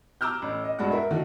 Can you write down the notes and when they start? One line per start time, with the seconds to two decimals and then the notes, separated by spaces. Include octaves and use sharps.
0.21 A#5 D6 E6 F6 G6
0.42 A1
0.64 D#5
0.79 G2 B2 G#3 D5 F#5
0.92 A#4 E5
1.11 D3 D#3 F#4